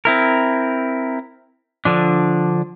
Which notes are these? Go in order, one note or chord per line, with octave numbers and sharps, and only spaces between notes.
C4 E4 A#4
D3 F3 D4